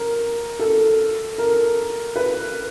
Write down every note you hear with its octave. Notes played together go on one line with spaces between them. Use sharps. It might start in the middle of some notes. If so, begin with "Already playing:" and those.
Already playing: A#4
A4
A#4
B4